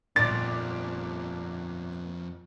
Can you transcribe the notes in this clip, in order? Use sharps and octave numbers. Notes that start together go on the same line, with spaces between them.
G1 F2 A#2 D#4 D5 D6 A6